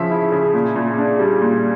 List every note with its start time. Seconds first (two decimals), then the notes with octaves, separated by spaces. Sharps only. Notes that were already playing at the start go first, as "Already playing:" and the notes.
Already playing: C#3 F3 C#4 E5
0.11 E4
0.32 C#3
0.54 A#2
0.76 A#2
0.98 D4
1.19 G3
1.42 A#2